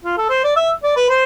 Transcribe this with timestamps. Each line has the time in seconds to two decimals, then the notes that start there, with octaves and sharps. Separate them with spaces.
0.04 F4
0.17 A4
0.29 C5
0.44 D5
0.56 E5
0.83 D5
0.96 B4
1.09 C5